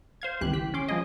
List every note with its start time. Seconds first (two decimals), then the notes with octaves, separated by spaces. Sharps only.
0.22 C5 F5 G#6
0.41 G#1 C#2 E3 G4 F#6
0.53 G4 B6
0.74 C#4 C6 D6
0.89 F3 G#3 G#4 D#5